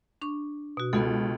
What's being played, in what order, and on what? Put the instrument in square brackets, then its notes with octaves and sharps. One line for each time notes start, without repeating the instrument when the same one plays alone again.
[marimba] D4 C#6
B2 F#4
[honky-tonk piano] C#2 [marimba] B3 F#4 A4